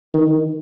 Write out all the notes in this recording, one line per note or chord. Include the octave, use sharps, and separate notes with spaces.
D#3